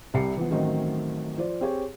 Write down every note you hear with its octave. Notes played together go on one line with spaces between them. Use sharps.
C2 C3 G3 C7 C#7
E3 F3 B3
A1 D#3 F#3 A3 C4 D#5
F3 C5 D5
C4 G4 G#4 C#5